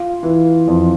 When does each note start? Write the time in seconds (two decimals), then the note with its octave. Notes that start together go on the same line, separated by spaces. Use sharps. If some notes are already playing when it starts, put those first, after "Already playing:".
Already playing: F4
0.23 E3
0.68 F2